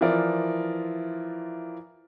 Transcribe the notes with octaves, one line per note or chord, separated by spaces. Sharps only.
E3 F3 E4 F4 A#4 D5